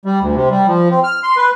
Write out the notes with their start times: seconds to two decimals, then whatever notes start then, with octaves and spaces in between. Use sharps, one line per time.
0.05 G3
0.21 D2
0.36 C3
0.51 G3
0.67 F3
0.90 C4
1.04 F6
1.23 C6
1.37 B4